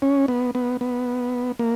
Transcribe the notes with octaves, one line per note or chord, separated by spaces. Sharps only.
C#4
B3
B3
B3
A#3